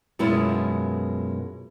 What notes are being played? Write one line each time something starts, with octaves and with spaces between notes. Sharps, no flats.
F#2 B2 G#3 B3 E4 F4